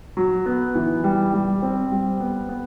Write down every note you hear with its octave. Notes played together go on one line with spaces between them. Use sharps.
F#3
B3
E3
G3
G3
C4
G3
B3
B3